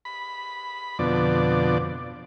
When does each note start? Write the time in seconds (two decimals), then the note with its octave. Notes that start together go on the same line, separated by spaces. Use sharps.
0.05 B5
0.99 F2 B2 D3 D5